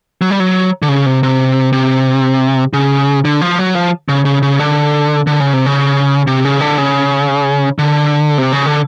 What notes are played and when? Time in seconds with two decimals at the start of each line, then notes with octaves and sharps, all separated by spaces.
0.22 F#3
0.30 G3
0.40 F#3
0.82 D3
0.89 C#3
1.06 C3
1.23 C3
1.72 C3
2.73 C#3
3.25 D3
3.41 F3
3.59 F#3
3.75 F3
4.09 C#3
4.25 C#3
4.42 C#3
4.59 D3
5.27 D3
5.40 C#3
5.53 C3
5.66 C#3
6.27 C3
6.45 C#3
6.61 D3
6.78 C#3
7.79 D3
8.38 C3
8.52 C#3
8.66 D3